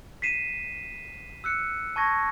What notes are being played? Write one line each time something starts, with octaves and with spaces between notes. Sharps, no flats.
B6 C7 D#7 E7
E6 F#6 C#7
A5 C#6 G#6 A#6